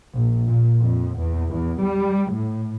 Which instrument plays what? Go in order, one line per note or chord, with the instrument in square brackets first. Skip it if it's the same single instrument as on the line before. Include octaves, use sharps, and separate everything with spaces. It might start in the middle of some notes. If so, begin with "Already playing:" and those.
[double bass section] A#1
A#2
F2
E2
E2
G3
A2